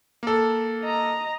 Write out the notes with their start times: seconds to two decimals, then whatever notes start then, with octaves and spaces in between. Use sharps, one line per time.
0.23 A#3 A4
0.83 D#5 A#5